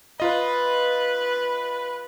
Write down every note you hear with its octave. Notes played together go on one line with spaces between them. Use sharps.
F4 B4 D#5